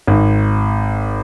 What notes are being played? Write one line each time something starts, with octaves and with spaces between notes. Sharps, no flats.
G#1